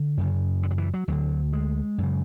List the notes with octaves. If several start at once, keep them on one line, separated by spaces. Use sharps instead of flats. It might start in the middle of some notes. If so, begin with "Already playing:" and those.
Already playing: D3
F#2 C#3
D3
F#3
E3
F#3
D2 D3 F#3
G#3
F#2 C#3